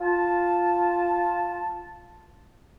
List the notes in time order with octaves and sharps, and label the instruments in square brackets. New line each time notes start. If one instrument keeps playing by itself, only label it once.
[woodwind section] F4 A5